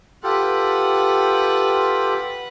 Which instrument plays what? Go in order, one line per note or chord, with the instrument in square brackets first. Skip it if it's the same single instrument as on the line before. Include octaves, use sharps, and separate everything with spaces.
[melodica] F4 G4 A4 [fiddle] B4 F#5